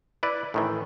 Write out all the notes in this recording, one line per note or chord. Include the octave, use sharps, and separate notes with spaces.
E4 B4 D5
A2 D#3 E3